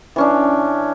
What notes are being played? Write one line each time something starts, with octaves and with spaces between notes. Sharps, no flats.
E3 C#4 D4